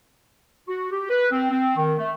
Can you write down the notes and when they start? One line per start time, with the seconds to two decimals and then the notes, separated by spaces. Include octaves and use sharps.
0.68 F#4
0.91 G4
1.09 B4
1.32 C4
1.50 C4
1.76 D#3
1.98 A3